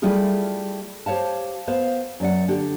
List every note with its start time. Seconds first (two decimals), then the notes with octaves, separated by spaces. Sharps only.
0.02 G3 A3 E4 F4 G#4
1.06 G4 C5 C#5 F5 A5
1.68 B3 C5 F5
2.20 F#2 D5 F#5
2.48 D3 D4 G4